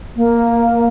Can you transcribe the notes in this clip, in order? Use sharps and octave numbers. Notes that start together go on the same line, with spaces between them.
A#3